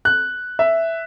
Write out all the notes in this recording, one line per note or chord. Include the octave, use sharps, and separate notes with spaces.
F#6
E5